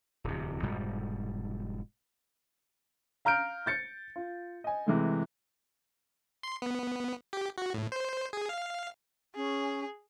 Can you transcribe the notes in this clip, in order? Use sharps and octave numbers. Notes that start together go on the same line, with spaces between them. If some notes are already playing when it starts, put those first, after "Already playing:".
D1 E2 C3
F1 G#2 B2 G3
F5 A#5 F6 G6 D7
G6 A6 C#7
F4
D#5 G#5
C3 E3 G#3 A3
C6
B3
G4
F#4
A2
C5
G#4
F5
C#4 G#4